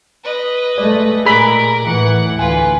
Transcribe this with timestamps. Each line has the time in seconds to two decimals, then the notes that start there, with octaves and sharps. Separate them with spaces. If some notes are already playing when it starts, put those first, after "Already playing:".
0.24 B4 D#5
0.78 G#3 A3 D5
1.25 A#2 G#4 A#4 B5 D6
1.86 A2 E3 F#5
2.39 D2 F4 B4 G#5